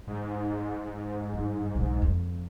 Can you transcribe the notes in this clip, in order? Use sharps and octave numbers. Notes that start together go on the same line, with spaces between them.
G#2
G2
B1
F2